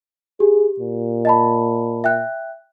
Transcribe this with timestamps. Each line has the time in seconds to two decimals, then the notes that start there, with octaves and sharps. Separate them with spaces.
0.40 G4 G#4
0.80 A#2
1.25 D#5 A5 B5
2.04 E5 G5 F#6